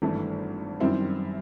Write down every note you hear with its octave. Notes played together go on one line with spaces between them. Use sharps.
G#1 G2 E3 A3
F#2 D#3 G3 C4 E4